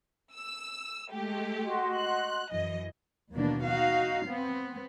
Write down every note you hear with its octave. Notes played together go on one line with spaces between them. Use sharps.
E6
G#3 A3 G4
F#4 D#5 C6
F#6
F#2 E3 D#5
D#2 B2 E3 A#3 D4
D#4 F#4 F5
B3 C4